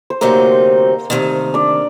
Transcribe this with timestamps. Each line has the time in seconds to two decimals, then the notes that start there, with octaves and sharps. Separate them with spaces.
0.10 C5
0.21 D2 C3 F#3 A#3 C4 D#4 A#4
1.10 D2 C3 D#3
1.54 D4 D5